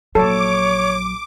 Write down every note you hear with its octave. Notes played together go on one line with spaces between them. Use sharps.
A#1 F#3 A4 C#5 D6